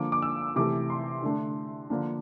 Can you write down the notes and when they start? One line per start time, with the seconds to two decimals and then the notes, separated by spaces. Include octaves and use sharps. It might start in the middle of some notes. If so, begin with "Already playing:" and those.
Already playing: D3 F3 A#3 D6
0.12 D6
0.22 E6
0.56 C3 E3 A3 D6
0.90 C6
1.23 D3 A3 D4
1.90 D3 F3 A#3 D4